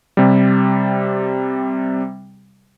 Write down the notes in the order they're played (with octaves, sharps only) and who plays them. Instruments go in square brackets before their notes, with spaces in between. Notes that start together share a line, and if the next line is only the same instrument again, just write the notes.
[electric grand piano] C3 G3